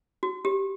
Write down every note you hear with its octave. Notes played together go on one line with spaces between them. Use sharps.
F#4
G4